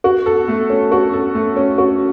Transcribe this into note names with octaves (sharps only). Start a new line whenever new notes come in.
F#4
A4
A3
C#4
F#4
A4
A3
C#4
F#4